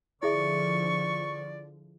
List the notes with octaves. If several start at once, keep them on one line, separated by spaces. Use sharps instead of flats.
D3 F3 E4 G#4 D5 E5 C#6